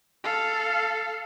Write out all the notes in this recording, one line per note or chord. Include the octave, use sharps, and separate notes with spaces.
A4 F5